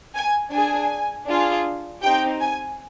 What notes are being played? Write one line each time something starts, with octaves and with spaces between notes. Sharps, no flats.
G#5
D4 G#4 G#5
D4 F4 G#4
C4 D#4 G4 G5
G#5